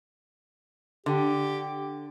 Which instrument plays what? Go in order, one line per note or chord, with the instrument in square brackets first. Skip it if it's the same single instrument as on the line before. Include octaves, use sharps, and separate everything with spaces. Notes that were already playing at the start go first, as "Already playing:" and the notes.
[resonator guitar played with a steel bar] D3 [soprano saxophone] G4